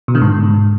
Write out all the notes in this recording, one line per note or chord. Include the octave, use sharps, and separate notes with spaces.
B2
D3
G#2